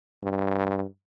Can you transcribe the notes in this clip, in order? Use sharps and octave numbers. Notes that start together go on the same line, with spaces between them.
G2